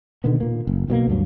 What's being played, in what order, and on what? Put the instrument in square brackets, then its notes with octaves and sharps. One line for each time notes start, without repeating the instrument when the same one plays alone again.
[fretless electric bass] B2 D3 D#3 B3
A#2 A#3
F#1
B1 B2 F#3 A#3
D2 G2 F#3